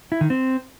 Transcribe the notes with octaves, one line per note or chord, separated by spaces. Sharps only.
E4
D#3
C4